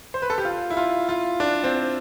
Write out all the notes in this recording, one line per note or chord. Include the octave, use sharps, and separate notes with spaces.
C5
B4
A4
G4
F4
E4
F4
F4
D4
C4